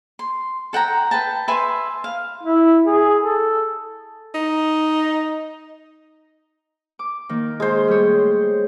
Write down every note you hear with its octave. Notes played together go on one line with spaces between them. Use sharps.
C6
A4 F#5 G5 A#5
B4 G5 A5
B4 E5 G#5 C6
F5
E4
G#4
A4
D#4
D6
D#3 A#3
G#3 C5
G3 A3 C#5